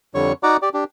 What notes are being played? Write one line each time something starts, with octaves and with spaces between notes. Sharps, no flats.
F2 D3 G3 C#5 C#6
D#4 F#4 D5 F#5 A#5 D6
G4 D5
D4 G4